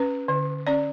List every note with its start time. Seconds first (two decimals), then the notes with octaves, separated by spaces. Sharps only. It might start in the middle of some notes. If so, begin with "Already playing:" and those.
Already playing: C#4 B4
0.28 D3
0.67 C#4 D5